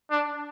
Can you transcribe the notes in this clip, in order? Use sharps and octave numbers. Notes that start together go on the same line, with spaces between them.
D4